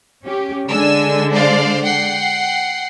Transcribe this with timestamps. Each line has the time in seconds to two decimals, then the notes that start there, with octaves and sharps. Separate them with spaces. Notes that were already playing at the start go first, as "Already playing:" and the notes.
0.25 C#4 G4
0.68 D3 G#3 D4 G#5 E6
1.31 C5 D5 F5
1.83 F#5 G5 C7